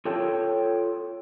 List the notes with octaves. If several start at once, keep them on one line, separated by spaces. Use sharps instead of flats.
F4 A4 C#5 G5 A5